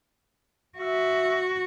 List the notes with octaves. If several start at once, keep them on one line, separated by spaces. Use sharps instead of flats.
F#4 E5